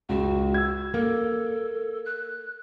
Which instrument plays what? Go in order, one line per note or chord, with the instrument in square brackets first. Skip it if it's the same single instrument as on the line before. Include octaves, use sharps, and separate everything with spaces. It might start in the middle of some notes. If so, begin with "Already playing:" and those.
[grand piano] C#2 [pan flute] F#4
[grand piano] E6 G#6
[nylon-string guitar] A#3 [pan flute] A4
[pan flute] F#6